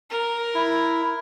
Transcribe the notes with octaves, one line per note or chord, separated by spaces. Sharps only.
A#4
E4